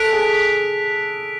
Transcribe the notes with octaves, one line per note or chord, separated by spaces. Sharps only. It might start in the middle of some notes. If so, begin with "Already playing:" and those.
Already playing: A4 F#6 B6 D7 F7
G#4